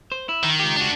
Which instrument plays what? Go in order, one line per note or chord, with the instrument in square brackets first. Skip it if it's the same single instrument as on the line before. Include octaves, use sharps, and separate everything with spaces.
[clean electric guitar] C5
E4
[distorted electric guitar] D#3
[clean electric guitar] C#2 F4 G4
[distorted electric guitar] D4 F#4